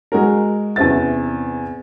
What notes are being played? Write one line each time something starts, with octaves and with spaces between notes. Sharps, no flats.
G#3 F#4 A#4
E2 C3 C#4 C5 E5 A6